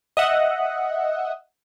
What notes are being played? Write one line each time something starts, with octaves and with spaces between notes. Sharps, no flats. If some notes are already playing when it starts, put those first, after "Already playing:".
D#5 E5 F#5